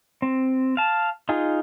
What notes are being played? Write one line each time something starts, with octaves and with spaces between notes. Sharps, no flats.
C4
F5 A5
D#4 F4 G#4